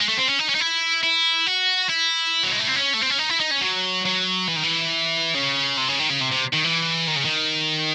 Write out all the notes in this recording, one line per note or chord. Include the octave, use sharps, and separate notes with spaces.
G#3
A3
C4
C#4
D#4
C#4
D#4
E4
E4
F#4
E4
F#3
G#3
A3
C4
C#4
A3
C4
C#4
D#4
E4
D#4
C#4
F#3
F#3
E3
D#3
E3
C#3
C3
C#3
D#3
C#3
C3
C3
D#3
E3
D#3
C#3
D#3